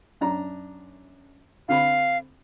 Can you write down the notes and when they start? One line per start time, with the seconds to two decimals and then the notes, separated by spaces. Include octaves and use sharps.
0.21 F#2 D4 A#5
1.69 D3 C4 F5 B5